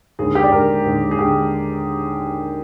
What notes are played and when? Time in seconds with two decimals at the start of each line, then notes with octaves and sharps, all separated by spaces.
0.19 D#2 D3 G#3 G#4
0.35 G4
0.44 D5
0.52 D#2 D3 G#3 A#4
0.85 D#2 D3 G#3
1.11 G#4
1.19 D3 G#3 G4